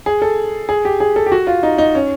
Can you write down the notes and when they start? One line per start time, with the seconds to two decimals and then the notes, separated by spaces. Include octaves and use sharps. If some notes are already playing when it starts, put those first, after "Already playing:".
0.06 G#4
0.22 A4
0.69 G#4
0.85 G4
1.00 G#4
1.16 A4
1.26 G4
1.32 F#4
1.47 F4
1.63 D#4
1.78 D#4
1.95 C#4